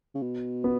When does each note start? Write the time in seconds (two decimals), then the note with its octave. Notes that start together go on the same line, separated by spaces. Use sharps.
0.15 C#3
0.22 B2
0.64 B3